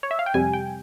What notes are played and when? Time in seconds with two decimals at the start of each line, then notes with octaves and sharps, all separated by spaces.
0.03 C#5
0.11 E5
0.19 F5
0.26 G5
0.34 F2 C3 G3 G#5
0.54 G5